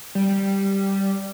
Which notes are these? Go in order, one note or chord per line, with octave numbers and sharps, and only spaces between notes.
G3